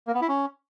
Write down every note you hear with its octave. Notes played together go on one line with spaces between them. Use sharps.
A#3
B3
E4
C#4